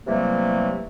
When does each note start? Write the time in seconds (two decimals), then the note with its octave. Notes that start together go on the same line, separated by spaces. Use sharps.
0.06 C3 E3 F#3 G3 A3 A#3